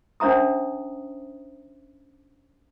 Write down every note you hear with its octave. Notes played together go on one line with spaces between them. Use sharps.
C#4 D4 C5 E5 A#5 D#6